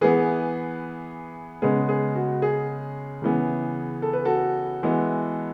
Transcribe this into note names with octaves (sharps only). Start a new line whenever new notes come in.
E3 B3 G#4 B4
C#3 G#3 B3 G#4
G#4
F#4
G#4
C#3 E3 B3
A4
B4
F#4 A4
E3 G#3 B3